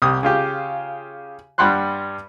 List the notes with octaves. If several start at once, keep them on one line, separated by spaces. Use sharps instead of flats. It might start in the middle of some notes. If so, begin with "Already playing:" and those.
C2 G4 D#6
C#3 F4 G4
G2 G3 F#5 B5 C6 F#6